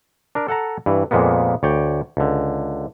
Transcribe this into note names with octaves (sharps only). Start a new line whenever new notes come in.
D4 A#4
A4 F#5 A5 A#5
G2 E3
F2 A#2 G#3 A#3 B3
D2 C#5 D5 G5
C#2 D3